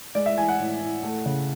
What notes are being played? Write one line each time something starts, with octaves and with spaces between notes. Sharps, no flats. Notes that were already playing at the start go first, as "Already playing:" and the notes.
G#3 D5
E5
E3 G#5
F#5
A2
A2
A3
C#3